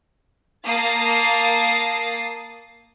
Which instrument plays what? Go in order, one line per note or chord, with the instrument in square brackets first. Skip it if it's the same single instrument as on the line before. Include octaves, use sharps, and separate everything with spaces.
[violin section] A#3 A5 D#6 A6 C7